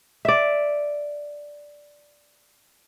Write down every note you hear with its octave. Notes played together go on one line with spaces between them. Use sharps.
D5 E5